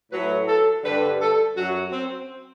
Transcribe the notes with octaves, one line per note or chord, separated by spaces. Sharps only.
A2 F#3 B4
A4
G2 D3 G3 B4
A4
F#2 F#3 F#4
C4